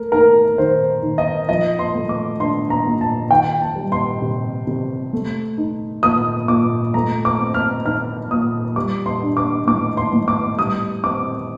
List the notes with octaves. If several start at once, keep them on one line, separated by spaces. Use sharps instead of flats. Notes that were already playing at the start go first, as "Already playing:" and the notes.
Already playing: A3 A#4
D#4 A#4
D#3 C5
D#3
D#5
F3 D#5
C6
A3
D6
D4 C6
A#5
A#2
A5
D#3 G5
A5
G3
C6
C3
C3
A3
D#4
A#2 D#6
A#2 D6
A3 A#5
D6
C4
F6
D#4 F6
A#2 D#6
G3 D6
C6
D4
D6
A2 D6
C6
A2
D6
G3 D#6
C4 D6